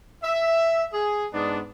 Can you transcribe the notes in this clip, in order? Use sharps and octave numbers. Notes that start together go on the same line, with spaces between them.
E5
G#4
G#2 B3 D4